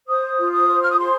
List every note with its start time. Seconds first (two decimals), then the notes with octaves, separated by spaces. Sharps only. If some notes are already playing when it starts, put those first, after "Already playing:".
0.06 C5 D#6
0.38 F4
0.52 D#6
0.68 C5
0.81 F6
0.89 D#6
0.98 G#4 C6